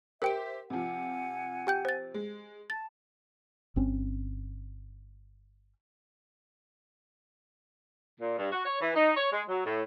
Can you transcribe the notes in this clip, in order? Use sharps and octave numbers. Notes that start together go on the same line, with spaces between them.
G4 A#4 C5 E5 G5 D7
C3 F3 F#5 G#5
G4 G5 G6
C5 A6
G#3
A5 A6
G1 C4 C#4
A#2
G2
F#4
C#5
E3
D#4
C#5
G#3
F#3
A2